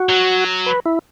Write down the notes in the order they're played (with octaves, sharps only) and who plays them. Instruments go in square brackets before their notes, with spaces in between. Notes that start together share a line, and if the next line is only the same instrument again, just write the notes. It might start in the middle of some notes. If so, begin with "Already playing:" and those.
Already playing: [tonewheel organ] F#4
[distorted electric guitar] F#3
[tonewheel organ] B4
E4